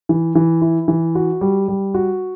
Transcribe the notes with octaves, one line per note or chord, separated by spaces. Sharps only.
E3
E3
E4
E3
F#4
G3
G3
F#4